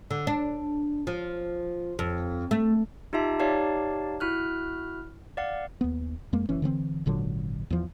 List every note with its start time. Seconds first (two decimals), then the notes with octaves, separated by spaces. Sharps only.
0.11 D3
0.27 D4
1.07 F3
1.99 F2
2.51 A3
3.13 D#4 F4 G4 E5 A5
3.39 D#4 G4 C#5 D5 F5 A5
4.20 E4 F#4 F6 F#6
5.37 D5 F5 F#5
5.81 D#2 B3
6.33 F2 G#3 A#3
6.49 F#1 E3 C#4
6.62 D3 E3 B3 C4
7.06 G#1 A#2 D3 F#3
7.70 E2 F3